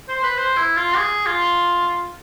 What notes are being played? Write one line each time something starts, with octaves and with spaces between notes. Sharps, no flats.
C5
B4
C5
E4
F4
G#4
F4